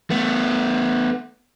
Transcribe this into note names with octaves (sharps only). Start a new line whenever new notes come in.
A3 B3